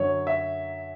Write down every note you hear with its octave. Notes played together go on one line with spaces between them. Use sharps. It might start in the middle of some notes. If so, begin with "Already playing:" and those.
Already playing: F#2 D3 F#3 C#5
E5